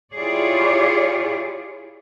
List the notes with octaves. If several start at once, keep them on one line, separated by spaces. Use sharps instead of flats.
E4 F4 G4 G#4 C#5 D5